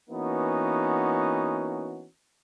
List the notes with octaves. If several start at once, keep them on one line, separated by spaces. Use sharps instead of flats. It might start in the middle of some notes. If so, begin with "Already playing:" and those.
E3 A#3 B3 C#4 D#4 F#4